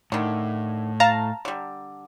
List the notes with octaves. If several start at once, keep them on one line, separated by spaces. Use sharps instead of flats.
A2 D3 D#3
F5 A5 A#5
D3 G3